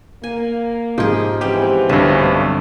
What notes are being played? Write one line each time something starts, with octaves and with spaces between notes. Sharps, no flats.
A#3 G#5
G#2 F3 F4 G4 G#4
B2 E3 C4 C#4 G4
B1 G2 D3 A3 C4